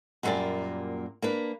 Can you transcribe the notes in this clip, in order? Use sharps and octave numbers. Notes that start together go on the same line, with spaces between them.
F#2 A#2 D#3 G3 A#3 D5
A#3 D4 B4